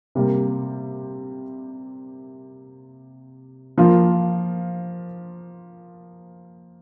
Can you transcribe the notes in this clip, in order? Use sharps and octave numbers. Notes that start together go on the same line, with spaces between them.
C3 G3 A#3
F3 A#3 F4